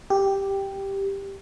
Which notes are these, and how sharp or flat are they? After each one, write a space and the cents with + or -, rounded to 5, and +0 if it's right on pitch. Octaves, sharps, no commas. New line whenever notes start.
G4 +0